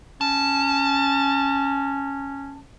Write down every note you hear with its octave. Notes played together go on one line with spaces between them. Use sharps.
C#4 A5